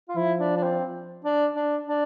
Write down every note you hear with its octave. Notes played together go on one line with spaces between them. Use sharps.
F4
F3 E4
D4
D4
C4
D4
D4
D4